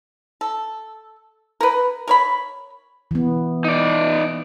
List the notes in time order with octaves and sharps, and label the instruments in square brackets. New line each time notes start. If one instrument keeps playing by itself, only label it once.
[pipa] A4
A#4 B4
A#4 C#5 B5
[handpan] E3 B3
[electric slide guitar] D#4 D5